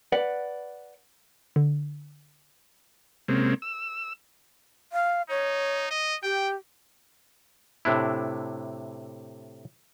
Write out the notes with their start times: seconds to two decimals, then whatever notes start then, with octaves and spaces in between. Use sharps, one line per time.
0.12 B4 D5 F#5
1.56 D3
3.28 C3 G#3 A#3 C4 C#4
3.62 E6
4.92 F5
5.29 D#4 C#5
5.91 D#5
6.23 G4 G5
7.85 A2 C3 D4 E4